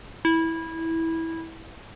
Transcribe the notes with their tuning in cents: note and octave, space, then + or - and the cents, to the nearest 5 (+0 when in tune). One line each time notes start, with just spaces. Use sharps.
E4 -15